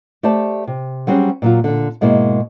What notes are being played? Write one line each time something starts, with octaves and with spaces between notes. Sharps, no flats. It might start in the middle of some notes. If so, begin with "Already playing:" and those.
A3 G4 C5 D5 A5
C3
F#3 G3 C4 C#4 F#4 G#4
A#2 F#3 F4
A#2 D3
G#2 B2 G#3 A#3 E4